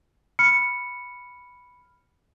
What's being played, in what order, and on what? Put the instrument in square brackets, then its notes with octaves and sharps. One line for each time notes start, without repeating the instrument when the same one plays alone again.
[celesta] B5 F6 C#7